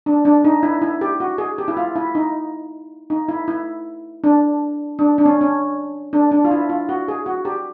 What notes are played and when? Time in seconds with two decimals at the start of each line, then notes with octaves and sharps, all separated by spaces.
0.06 D4
0.25 D4
0.45 D#4
0.63 E4
0.82 E4
1.01 G4
1.20 F#4
1.38 G#4
1.58 G4
1.68 E4
1.77 F4
1.96 E4
2.15 D#4
3.10 D#4
3.28 E4
3.48 E4
4.24 D4
4.99 D4
5.18 D4
5.25 C#4
5.41 C#4
6.13 D4
6.31 D4
6.45 F4
6.51 E4
6.69 F4
6.89 F#4
7.08 G#4
7.26 F#4
7.45 G4